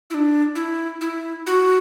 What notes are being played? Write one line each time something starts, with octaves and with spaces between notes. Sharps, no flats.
E4
D4
E4
E4
F#4